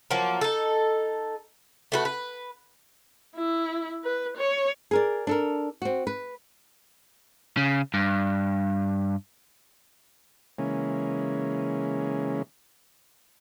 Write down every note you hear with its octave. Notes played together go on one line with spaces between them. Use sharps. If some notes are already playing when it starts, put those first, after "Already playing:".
F3 F#3 A#3
D#4 A4
A3 F#4 B4
B4
E4
B4
C#5
G#4 A#4 D5
D4 A4 A#4
C4 F#4
B4
C#3
G2
C#3 E3 G#3 A#3 C#4